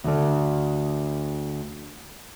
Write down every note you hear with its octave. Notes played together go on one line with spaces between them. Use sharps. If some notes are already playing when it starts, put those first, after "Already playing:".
D2 D3